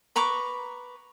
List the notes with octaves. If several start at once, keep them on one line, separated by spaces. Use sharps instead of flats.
B4 A#5 C#6 D6